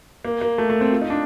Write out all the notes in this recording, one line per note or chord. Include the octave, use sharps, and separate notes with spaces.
A#3
A#3
A3
A3
C4
F4
D#4
D4